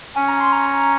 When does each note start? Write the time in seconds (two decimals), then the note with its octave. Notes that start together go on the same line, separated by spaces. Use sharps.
0.15 C#4 G#5
0.28 A#5
0.40 C6
0.52 A#5